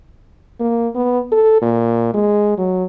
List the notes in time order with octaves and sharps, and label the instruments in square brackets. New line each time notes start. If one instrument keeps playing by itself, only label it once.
[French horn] A#3
B3
A4
A#2
G#3
F#3